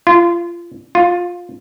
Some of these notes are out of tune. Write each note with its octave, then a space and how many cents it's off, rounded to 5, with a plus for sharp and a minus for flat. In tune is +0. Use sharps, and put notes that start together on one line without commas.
F4 -25
F4 +15